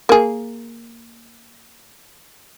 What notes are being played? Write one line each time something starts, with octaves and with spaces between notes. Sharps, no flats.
A#3 G#4